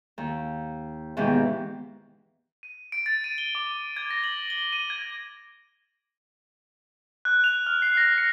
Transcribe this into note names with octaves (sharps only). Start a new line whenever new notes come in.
D#2
D#2 G#2 B2 E3 G4
D#7
D7
A6
D#7
G7
D6
G#6
A#6
F#7
G7
D#7
G#6
F#6
F7
F6
C7
A#6
C#7